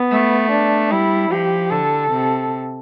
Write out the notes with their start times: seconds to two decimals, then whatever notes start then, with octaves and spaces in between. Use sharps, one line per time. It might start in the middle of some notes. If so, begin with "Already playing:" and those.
Already playing: B3
0.11 A3
0.51 D4
0.91 G3 E4
1.31 F3 G4
1.71 D3 A4
2.11 C3